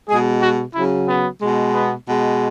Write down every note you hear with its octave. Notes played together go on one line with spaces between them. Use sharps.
B2 G#3 G#4
F#4
C#3 F#3 E4
B3
B2 G#3
B3
B2 G#3